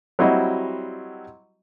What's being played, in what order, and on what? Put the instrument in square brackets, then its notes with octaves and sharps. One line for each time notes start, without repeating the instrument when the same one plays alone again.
[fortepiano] F#3 G3 C4 E4 F#4 D#5